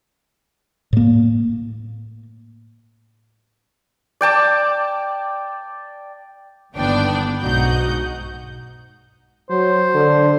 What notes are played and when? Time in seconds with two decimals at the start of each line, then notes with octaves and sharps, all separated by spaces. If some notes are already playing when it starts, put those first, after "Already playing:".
0.93 A2 A#3
4.21 D5 G5 A5 D6
6.75 G1 D#2 D3 B3 D4 G5
7.42 B1 G#2 D#4 F#4 F#5 G6
9.50 F#3 C5
9.94 D3